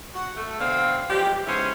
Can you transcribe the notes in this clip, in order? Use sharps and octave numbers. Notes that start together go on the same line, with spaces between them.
F#4
A3
D2 B2 D3 C4 F5
E3 F3 G3 G#3 G4
G#2 C#3 B3 C#4 E4 C5